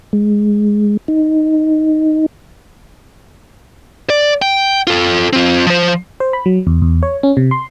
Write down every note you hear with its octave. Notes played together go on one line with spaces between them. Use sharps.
G#3
D#4
D5
G5
F4 A4
C4 F4
F3 C5
C5
B5
F#3
E2
E2
C#5
C#4
C3
C6